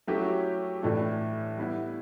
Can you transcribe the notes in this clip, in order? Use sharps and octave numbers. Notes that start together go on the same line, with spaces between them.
F#3 A3 C#4 E4 G4
A2 E3 A3 D4
G3 B3 E4